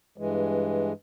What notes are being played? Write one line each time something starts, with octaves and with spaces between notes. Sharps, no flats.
G2 E3 G#3